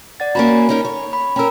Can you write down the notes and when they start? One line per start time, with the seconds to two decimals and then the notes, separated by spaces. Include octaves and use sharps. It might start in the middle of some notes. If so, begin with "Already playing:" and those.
0.20 D5 F#5 A6
0.35 A#3 C#4 F#4 A#5 B5
0.69 C#4 D#4 A#4
0.85 C#5
1.13 B5
1.36 C#4 A#4 G5 A#5 E6